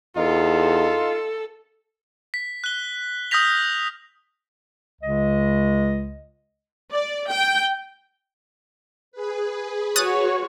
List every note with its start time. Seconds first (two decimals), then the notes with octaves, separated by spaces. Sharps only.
0.17 E2 D#4 F4 A4
2.34 B6
2.64 F#6 G7
3.31 D#6 F6 G6 A#6 B6 F7
5.02 C#2 C#3 G#3 D#5
6.91 D5
7.29 G5
9.12 G#4 B4
9.96 F#4 C#5 D#6 F#6 A6